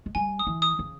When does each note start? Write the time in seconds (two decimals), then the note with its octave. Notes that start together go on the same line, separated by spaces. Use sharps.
0.06 G#3
0.15 G3 G#5
0.39 D#6
0.47 E3
0.62 D#6
0.79 C#3